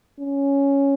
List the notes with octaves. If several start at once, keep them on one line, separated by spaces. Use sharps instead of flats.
C#4